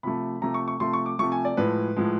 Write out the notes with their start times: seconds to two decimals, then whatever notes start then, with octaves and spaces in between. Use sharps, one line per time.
0.03 C3 F3 A3 B5
0.42 C3 F3 A3 A#5
0.54 C#6
0.68 C#6
0.80 C3 F3 A3 C6
0.93 C#6
1.06 D6
1.19 C3 F3 A3 C#6
1.32 G#5
1.45 D5
1.57 A2 F3 G#3 B4
1.96 A2 F3 G#3